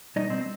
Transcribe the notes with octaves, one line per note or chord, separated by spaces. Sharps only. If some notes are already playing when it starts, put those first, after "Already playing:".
B2 G3 D#4 D#5
C4 C5